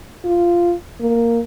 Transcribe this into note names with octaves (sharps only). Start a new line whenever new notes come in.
F4
A#3